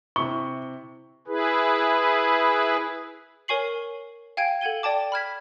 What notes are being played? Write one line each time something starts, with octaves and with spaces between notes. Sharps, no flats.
C3 E4 C#6 G7
E4 G#4 B4
A#4 C#5 G#5 C#6 C7 F#7
F5 G5 G#5 G#6 D7
A4 F#5 G#6 D#7 G7
D5 G5 A5 D6
B5 F6 G#6 B6